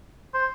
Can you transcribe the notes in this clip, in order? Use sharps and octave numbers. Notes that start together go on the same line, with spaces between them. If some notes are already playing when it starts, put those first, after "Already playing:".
C5